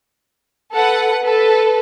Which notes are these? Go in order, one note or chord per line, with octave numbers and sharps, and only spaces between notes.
A4 B4 F#5
A4 B4